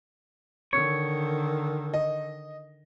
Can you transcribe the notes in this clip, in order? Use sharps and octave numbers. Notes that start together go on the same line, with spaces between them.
D3 D#3 C#5
D#5